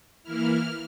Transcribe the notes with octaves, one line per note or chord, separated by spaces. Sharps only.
E3 A#3 E4 F6